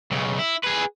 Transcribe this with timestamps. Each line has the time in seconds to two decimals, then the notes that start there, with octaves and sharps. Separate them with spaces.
0.11 B1 C#3
0.38 E4
0.64 G#4 B4